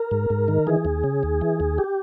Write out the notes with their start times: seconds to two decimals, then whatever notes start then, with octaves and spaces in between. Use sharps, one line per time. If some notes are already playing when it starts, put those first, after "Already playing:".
Already playing: A#4
0.11 G#2
0.30 G#2
0.48 D#3
0.67 E3 G#4
0.85 D#2
1.04 C#3
1.23 D#2
1.41 E3
1.60 D#2
1.78 G4